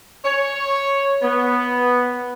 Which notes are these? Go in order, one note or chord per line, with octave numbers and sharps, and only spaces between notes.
C#5
B3